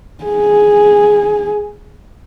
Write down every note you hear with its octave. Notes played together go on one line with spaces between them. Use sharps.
G#4